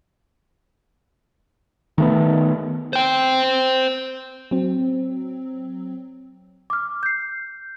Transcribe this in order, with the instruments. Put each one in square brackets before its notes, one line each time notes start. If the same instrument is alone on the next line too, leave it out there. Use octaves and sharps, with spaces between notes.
[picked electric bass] D#3 A3 B3
[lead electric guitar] C5 G5
[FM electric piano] F#3 C4
[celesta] D6 F6
G6 C7